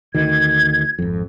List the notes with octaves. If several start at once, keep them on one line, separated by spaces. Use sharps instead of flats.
D2 D#3 G#6
G#1 F2